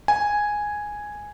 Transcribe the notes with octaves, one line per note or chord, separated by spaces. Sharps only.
G#5